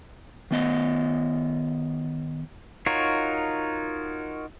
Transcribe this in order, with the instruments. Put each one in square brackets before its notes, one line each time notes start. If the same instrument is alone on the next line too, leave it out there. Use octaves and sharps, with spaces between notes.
[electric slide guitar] D#3 B3 D#5
[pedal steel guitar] D#4 F4 F#4 A#4 C#5